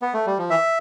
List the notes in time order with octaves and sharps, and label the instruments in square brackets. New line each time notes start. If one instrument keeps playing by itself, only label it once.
[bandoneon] B3
A3
G3
F3
[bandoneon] E3 [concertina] E5